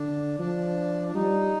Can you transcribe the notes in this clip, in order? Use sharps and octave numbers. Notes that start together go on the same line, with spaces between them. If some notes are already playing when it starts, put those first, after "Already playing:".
Already playing: D3 D4
F3 D4
D4
G3 D#4